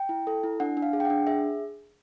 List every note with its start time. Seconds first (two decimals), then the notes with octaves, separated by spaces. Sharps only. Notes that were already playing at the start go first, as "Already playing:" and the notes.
Already playing: G5
0.09 E4
0.27 A4
0.43 E4
0.60 D4 F#5
0.77 D4
0.82 F5
0.93 G#4
1.00 G5
1.05 F#5
1.10 D4
1.27 G#4 E5